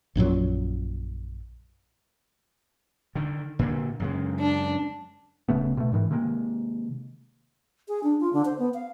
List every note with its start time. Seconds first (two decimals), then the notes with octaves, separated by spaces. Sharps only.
0.15 A#1 F#2 A#2 F#3
3.15 D3 D#3
3.59 A#2 D3
4.00 F#2 C#3 G#3
4.40 D4
5.49 D1 C#3 A3 B3
5.77 B2 A3
5.93 G#2 D#3 E3
6.11 C3 D#3 G#3 A#3
7.88 G#4
8.03 D4
8.20 F4
8.33 D3
8.45 C5
8.58 B3
8.74 F5